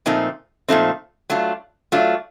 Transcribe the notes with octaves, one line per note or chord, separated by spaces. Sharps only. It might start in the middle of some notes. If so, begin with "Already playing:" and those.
A#2 F3 A3 C4 D#4
A#2 F3 A3 C4 D#4
F#3 A3 D4 F4
F#3 A3 D4 F4